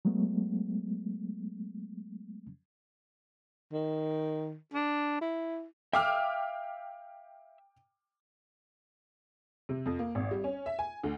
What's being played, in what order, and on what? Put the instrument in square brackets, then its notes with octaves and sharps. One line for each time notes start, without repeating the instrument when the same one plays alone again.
[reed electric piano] F#3 G#3 A3 B3
[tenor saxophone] D#3
D4
E4
[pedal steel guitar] E5 F5 E6 [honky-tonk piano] G5 D6 F6
[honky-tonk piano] C3
F2
A#3
G#1
G3
C#4
E5
G#5
D2